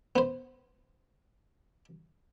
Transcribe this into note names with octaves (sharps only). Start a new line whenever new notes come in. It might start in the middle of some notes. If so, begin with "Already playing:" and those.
B3 C5